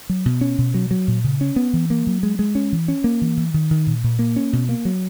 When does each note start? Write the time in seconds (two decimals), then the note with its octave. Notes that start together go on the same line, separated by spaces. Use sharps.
0.09 F#3
0.26 B2
0.41 C#4
0.58 B2
0.74 F#3
0.91 F#3
1.08 A#2
1.24 C#3
1.41 C#4
1.56 B3
1.73 E3
1.90 A#3
2.07 F#3
2.23 G#3
2.39 G#3
2.55 C#4
2.72 E3
2.88 C#4
3.04 A#3
3.21 E3
3.37 E3
3.54 D#3
3.71 D#3
3.87 A#2
4.04 A#2
4.19 A#3
4.36 C#4
4.53 B2
4.69 A#3
4.85 F#3